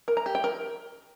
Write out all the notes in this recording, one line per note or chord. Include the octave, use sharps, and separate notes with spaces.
A#4
A#5
G4
G5
A#4